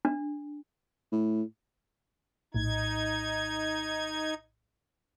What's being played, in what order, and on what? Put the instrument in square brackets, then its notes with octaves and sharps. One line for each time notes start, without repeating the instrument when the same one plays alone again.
[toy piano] D4
[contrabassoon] A2
[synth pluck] A#1 A2 [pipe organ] D#4 G#6